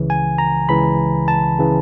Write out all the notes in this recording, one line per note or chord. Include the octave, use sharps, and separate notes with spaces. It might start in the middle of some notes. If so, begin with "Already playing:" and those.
Already playing: C#2 C#3 E3
G#5
A#5
C#2 C#3 E3 B5
A5
C#3 E3